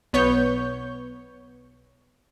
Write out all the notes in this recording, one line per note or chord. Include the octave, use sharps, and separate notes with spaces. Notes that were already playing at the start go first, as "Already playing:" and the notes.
B1 B3 C#5 C#6 G6